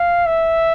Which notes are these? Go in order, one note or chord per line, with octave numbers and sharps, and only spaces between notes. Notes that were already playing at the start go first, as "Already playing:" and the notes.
Already playing: F5
E5